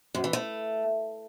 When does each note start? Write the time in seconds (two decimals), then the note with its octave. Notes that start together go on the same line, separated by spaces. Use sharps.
0.15 F#2
0.24 E3
0.33 A3